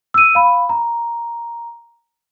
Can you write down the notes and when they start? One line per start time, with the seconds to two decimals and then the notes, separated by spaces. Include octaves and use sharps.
0.14 E6 D#7
0.35 F5 B5
0.69 A#5